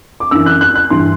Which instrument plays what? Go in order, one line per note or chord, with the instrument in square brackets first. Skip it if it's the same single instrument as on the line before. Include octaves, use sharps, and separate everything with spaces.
[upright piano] D6
F#2 E3 E6
F#6
F#6
F#6
G2 E3 C6